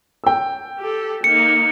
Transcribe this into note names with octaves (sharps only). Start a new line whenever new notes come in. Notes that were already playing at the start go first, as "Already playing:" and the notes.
G5 E6
G4 A4
A#3 D#4 C#7